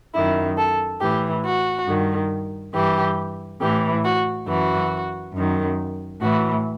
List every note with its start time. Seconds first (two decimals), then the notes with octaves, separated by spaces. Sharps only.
0.13 F#2 D#3 E4
0.57 A4
1.00 A2 E3 G4
1.43 F#4
1.86 G2 D#3
2.73 G2 E3 G4
3.60 A2 E3 G4
4.03 F#4
4.47 F#2 E3 F#4
5.34 F#2 D#3
6.21 A2 E3 F#4